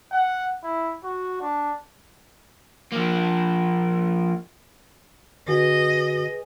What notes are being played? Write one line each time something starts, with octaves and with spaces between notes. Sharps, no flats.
F#5
E4
F#4
D4
F3 A#3
D3 F#4 G#4 B4 D#5 G#5